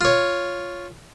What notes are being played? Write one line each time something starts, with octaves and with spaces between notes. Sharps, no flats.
F4 C#5